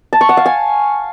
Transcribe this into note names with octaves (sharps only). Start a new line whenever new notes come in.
A5
C#6
F#5
F5
G#5